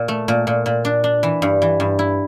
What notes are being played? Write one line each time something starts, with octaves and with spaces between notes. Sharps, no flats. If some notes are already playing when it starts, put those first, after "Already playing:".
Already playing: A#2
A3
A#2
A#2
A#2
D4
D4
E3
G2
E3
G2
E4